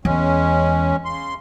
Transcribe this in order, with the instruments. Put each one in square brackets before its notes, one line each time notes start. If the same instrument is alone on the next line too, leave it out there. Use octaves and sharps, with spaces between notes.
[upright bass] E2 [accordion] G#3 C#4
[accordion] C#3 C6